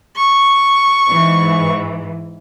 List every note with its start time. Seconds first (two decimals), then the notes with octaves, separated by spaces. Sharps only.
0.17 C#6
1.09 G#2 E3